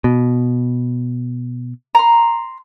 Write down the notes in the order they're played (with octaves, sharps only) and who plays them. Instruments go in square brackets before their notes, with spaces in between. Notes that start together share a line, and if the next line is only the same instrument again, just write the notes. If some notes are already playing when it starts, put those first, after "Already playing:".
[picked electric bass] B2
[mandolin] A#5 C6